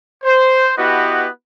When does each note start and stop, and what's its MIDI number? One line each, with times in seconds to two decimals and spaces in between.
0.24 0.73 72
0.76 1.28 59
0.76 1.28 64
0.76 1.28 66
0.76 1.28 67
0.76 1.28 71
0.76 1.28 75